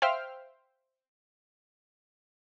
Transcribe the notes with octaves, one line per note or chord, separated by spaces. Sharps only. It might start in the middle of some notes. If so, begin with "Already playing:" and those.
C5 E5 F5 G5 F6